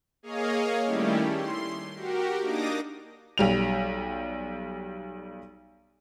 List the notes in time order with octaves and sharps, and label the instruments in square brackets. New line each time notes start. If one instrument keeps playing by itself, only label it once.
[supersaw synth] A#3 G#4 C#5 D#5 F5
D#3 G3 A3 C#4 E4 G4
C6
F#4 G4 A#4
A#3 D4 D#4 D6 D#6 A#6
[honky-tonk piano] B1 G3 F7